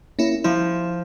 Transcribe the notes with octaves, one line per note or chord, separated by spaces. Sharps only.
A#3 C#4 E4
F3 E4